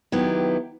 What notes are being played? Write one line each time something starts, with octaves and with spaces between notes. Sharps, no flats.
D#3 F#3 B3 E4 G4